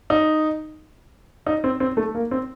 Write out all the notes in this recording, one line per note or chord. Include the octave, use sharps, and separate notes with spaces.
D#4
D#4
C4
C4
A3
A#3
C4